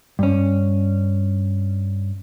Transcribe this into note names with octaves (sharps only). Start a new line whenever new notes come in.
G2 C#4